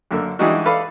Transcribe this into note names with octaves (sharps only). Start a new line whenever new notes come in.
F#2 D3 A#3 E6
E3 G3 G#3 D4 D#4 F#4
A4 B4 D5 F5 B5